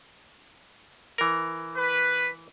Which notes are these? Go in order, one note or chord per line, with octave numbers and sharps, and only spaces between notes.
E3 A#4
B4